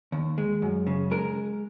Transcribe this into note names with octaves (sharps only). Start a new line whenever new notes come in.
D#2
G#3
F#2
C#3
G#3 A#4